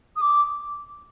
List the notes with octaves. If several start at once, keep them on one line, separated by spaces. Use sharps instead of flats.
D#6
D6